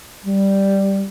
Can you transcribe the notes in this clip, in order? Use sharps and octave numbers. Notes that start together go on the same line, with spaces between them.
G3